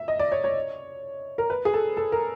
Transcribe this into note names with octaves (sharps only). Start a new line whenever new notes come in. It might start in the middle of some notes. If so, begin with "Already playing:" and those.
Already playing: E5
D#5
D5
C#5
C#5
A#4
B4
G#4
A4
A4
A#4